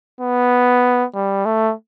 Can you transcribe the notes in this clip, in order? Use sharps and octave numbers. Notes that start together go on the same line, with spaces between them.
B3
G3
A3